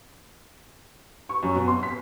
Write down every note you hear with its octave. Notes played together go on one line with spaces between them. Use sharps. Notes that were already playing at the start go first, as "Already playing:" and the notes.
C#6
F#2
B2
C6
B6